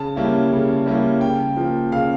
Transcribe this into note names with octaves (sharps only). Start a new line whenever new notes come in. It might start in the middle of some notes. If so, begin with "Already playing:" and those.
Already playing: C#3 A5
G3 A#3 C#4 E4
C#3
G3 A#3 C#4 E4
C#3 G5
F3 A#3
C#3 F5